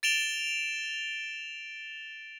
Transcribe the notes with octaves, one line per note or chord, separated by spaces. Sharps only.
A6 D7 E7 F7 G7